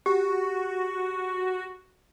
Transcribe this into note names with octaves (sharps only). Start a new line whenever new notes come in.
F#4 G4